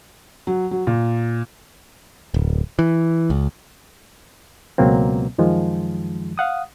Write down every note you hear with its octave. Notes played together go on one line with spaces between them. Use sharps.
F#3
F#3
A#2
D1
E3
C#2
C#2 B2 F#3 A#3 C4
F#2 D#3 F3 G#3
F5 F#5 D#6